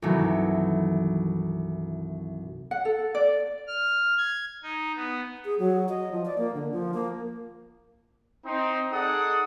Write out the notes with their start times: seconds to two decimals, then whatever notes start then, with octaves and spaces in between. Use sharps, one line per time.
0.02 C2 G2 D#3 E3 F#3 A3
2.71 F#5
2.85 A4
3.15 D5
3.67 F6
4.18 G#6
4.63 D#4
4.96 B3
5.45 G#4
5.59 F#3
5.89 D#5
6.11 F3
6.25 D5
6.38 A#3
6.54 D3
6.72 F3
6.94 A#3
8.45 C4 D#4
8.92 D#4 G#4 A4 D5 F#5 D#6